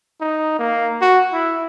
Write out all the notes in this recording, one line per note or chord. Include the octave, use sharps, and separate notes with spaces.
D#4
A#3
F#4
E4